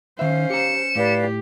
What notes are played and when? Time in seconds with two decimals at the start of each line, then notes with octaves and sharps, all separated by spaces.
0.19 D#3 C#4 C5 E5 F5
0.50 G4 A#5 C#7 E7
0.96 A2 G4 B4 D5 F5